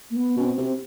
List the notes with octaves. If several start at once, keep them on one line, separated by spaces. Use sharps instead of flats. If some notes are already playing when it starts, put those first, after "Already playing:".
A#3
B3
B2 C#4
C4
C3
C4